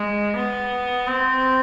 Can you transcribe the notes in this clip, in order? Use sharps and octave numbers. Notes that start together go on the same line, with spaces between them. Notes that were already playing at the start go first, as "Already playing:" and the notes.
Already playing: G#3
B3
C4